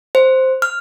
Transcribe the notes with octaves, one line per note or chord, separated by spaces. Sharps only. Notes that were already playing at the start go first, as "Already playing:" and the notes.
C5
F6